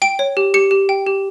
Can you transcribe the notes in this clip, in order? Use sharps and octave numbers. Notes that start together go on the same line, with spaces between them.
G5 D7
C#5
G4
G4 C#7
G4
G5
G4